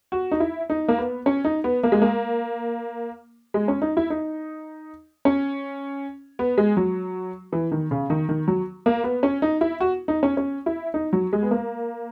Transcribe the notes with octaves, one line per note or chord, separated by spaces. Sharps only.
F#4
D#4
E4
D#4
A#3
B3
C#4
D#4
B3
A#3
G#3
A#3
G#3
C#4
D#4
E4
D#4
C#4
B3
G#3
F#3
E3
D#3
C#3
D#3
D#3
F#3
A#3
B3
C#4
D#4
E4
F#4
D#4
C#4
C#4
E4
D#4
F#3
G#3
B3
A#3